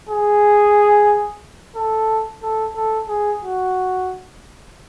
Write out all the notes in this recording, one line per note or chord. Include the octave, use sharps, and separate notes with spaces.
G#4
A4
A4
A4
G#4
F#4